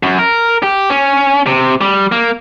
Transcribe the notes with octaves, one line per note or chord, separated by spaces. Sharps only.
F#2
A#4
G4
C#4
C3
G3
A#3